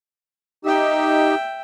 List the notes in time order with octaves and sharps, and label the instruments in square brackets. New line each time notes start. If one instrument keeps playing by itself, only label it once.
[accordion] D#4 G4 [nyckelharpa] E5 G5